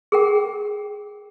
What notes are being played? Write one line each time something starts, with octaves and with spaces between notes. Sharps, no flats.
G#4 A#4 G5